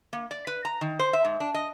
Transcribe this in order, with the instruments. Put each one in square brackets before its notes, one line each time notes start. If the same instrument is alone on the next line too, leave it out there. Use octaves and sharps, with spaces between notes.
[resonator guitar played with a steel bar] A#3
D5
B4
A#5
D#3
C5
E5
G#2
D4
D#5